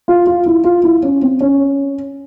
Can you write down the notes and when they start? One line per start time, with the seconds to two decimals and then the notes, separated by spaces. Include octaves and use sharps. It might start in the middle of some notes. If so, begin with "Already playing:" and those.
0.08 F4
0.27 F4
0.46 E4
0.64 F4
0.84 E4
1.03 C#4
1.22 C4
1.41 C#4